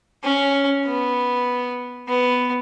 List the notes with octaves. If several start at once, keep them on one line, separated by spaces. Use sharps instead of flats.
C#4
B3
B3